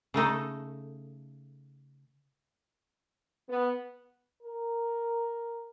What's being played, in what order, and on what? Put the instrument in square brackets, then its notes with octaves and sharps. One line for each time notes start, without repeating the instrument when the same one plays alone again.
[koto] C#3 A3 D#4 A4
[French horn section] B3
[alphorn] A#4